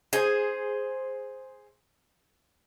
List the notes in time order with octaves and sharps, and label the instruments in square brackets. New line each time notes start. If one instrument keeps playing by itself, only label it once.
[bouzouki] G#4 C5